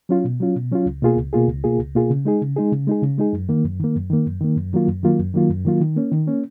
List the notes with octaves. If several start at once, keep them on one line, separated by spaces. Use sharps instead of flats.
F#3 C#4 F4
B2
F#3 C#4 F4
B2
F#3 C#4 F4
C#2
B2 A#3 F4 G#4
C#2
B2 A#3 F4 G#4
C#2
B2 A#3 F4 G#4
C#2
B2 A#3 F4 G#4
C#3
G#3 D#4 G#4
C#3
G#3 D#4 G#4
C#3
G#3 D#4 G#4
C#3
G#3 D#4 G#4
F#2
D#3 A#3
F#2
D#3 A#3
F#2
D#3 A#3
F#2
D#3 A#3
F#2
D#3 F#3 A#3 F4
F#2
D#3 F#3 A#3 F4
F#2
D#3 F#3 A#3 F4
F#2
D#3 F#3 A#3 F4
D#3
A#3 C#4
D#3
A#3 C#4